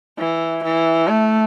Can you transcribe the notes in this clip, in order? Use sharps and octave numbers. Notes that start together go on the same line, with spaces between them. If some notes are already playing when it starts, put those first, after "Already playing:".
E3
E3
A3